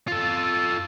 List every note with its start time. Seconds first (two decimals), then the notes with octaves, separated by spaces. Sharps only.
0.08 F4 A4